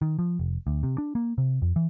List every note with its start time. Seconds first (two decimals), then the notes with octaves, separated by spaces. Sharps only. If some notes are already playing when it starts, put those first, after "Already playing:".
0.02 D#3
0.19 F3
0.39 F1
0.67 D2
0.83 C3
0.98 D4
1.15 A#3
1.38 C3
1.62 F2
1.76 E3